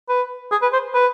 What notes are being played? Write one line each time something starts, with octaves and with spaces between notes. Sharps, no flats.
B4
G#4
B4
C5
B4